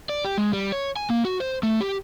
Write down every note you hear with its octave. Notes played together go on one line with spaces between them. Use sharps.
D5
G4
G#3
G3
C#5
G#5
A#3
F#4
C5
A3
G4